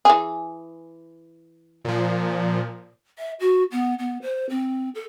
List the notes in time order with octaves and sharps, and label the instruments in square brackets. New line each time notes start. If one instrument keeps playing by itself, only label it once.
[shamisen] E3 G#4
[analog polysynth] A#2 F3
[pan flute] E5
F#4
B3
B3
C5
C4
A4